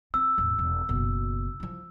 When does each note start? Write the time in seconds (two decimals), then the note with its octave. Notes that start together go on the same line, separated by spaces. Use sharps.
0.14 C4 E6
0.38 D#1 G#1
0.59 E1
0.89 F#1 B2
1.60 F3 E4